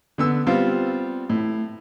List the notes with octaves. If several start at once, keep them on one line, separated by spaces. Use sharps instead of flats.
D3 B3 E6
G3 B3 C4 F4
A2